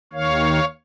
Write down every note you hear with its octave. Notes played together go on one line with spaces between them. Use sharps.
D#2 D#3 C#5 F5